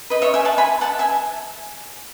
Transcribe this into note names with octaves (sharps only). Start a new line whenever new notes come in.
B4 D#5
C#5 E5
E5 G#5
F#5 A5
G#5 B5
F#5 A5
E5 G#5